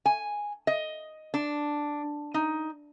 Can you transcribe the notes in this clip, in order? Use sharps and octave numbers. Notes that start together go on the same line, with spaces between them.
G#5
D#5
D4
D#4